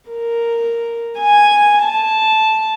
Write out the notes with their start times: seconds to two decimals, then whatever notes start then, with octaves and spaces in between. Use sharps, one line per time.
0.10 A#4
1.19 G#5
1.83 A5